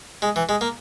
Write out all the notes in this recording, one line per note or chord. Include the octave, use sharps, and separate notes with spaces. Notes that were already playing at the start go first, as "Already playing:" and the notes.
G#3
E3
G#3
A#3